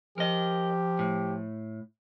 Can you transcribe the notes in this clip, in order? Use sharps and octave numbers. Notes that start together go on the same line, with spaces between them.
F3 G4 A#4 D#5
A2